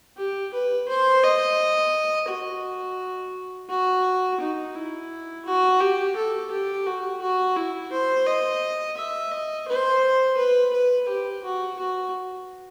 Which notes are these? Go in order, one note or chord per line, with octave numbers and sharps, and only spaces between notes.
G4
B4
C5
D#5
F#4
F#4
D#4
E4
F#4
G4
A4
G4
F#4
F#4
E4
C5
D#5
E5
D#5
C5
B4
B4
G4
F#4
F#4